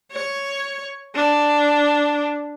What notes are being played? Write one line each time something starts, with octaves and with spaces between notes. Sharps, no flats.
C#5
D4